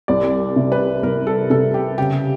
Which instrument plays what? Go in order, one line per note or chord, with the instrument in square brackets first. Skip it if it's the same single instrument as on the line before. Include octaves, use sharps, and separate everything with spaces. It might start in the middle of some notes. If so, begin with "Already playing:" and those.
[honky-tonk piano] C2 [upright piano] D5
[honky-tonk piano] C3
[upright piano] B4
[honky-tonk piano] C2 [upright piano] A#4
[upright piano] A4
[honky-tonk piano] C3 [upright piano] A4
[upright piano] G4
[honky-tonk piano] C#3 [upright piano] G4